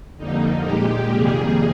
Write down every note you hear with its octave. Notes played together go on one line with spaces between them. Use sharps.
F2 D3 G3 A#3 D#4
A#2 G#3 G4
F2 C3 D#3 G3 A#3 G#4